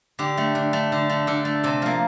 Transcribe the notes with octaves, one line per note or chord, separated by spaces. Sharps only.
D3 G4
A3
D3
A3
D3
A3
D3 A4
A3
C3 A4
F3 A#3